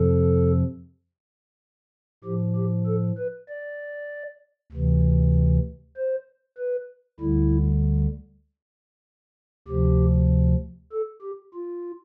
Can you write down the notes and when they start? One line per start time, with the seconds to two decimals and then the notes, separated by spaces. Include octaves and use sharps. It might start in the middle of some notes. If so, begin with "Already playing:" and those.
Already playing: F2 C3 F3 A4
2.24 A2 F3 G4
2.56 G4
2.86 A4
3.18 B4
3.49 D5
4.72 D2 C3 E3
5.97 C5
6.58 B4
7.20 D2 D3 G3 E4
9.68 D2 C3 F3 G4
10.92 A4
11.22 G4
11.54 F4